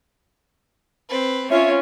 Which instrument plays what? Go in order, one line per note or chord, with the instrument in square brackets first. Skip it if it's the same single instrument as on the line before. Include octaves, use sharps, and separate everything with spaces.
[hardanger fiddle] C4 B4
[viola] C#4 F4 [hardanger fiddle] C#5 [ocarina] E5